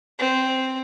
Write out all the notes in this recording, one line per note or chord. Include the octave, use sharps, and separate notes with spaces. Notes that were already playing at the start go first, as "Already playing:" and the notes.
C4